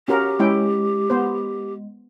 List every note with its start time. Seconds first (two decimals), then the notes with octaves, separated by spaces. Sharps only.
0.08 C#4 F#4 G4 A#4
0.39 G#3 C#4 E4 G5
1.10 B3 C5